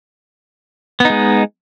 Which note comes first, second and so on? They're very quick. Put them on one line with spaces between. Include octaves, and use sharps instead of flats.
B3 D#4 G#3